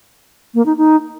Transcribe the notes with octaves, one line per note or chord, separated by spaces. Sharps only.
A#3
D#4
D#4